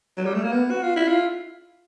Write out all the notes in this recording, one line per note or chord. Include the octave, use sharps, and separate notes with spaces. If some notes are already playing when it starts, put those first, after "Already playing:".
F#3
G3
A3
A#3
B3
F#4
F4
E4
F4